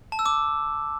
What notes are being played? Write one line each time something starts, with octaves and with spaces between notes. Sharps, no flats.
A5
E6
D6